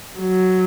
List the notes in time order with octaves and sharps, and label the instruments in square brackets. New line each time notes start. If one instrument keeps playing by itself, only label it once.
[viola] F#3